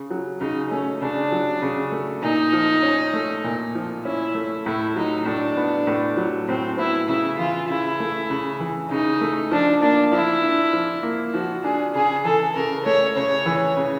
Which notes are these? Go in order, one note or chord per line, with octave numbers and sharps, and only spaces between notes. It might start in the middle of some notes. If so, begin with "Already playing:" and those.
Already playing: C#3
F#3
C#3 D#4
A3 C#4
C#3 D4
F#3
C#3
A3
A#2 D#4
F3
C#4
A3
A#2
F3
C#4 E4
A3
A2 E4
F#3 D#4
A2 D4
B3
A2
F#3
A2 C4
B3 E4
C#3 E4
E3 F4
C#3 E4
A3
C#3
E3
C#3 D#4
A3
F3 D4
A#3 D4
F3 E4
D4
F3
A#3
F3 F#4
D4 G#4
C#3 G#4
E3 A4
C#3 A#4
A3 C#5
C#3 C#5
E3
C#3